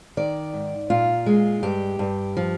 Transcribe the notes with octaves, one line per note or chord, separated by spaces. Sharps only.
D#3 D5
G#2
A#2 F4
G#3
G2 G4
G2
F3